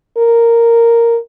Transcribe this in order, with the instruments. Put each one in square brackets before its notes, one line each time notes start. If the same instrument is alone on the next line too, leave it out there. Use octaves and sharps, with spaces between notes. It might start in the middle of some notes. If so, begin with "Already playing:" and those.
[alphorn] A#4